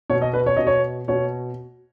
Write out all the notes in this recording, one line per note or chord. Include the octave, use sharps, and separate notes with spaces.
B2 C#5
D#5
B4
C#5
B2 D#5
C#5
B2 C#5